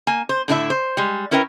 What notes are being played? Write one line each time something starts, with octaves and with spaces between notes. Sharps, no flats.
A#3 G#5
C5
A2 D3 D4 E4 F4 E5
C5
G3 G#3
C#4 E4 A#4 B4 F5 G5